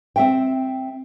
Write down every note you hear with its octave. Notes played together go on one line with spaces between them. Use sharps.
C4 E5 G5